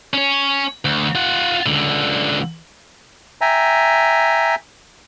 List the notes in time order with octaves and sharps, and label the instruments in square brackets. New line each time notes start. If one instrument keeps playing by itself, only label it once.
[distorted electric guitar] C#4 C#5
D2
F4 F#5
C#2 D3
[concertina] E5 G5 G#5 A#5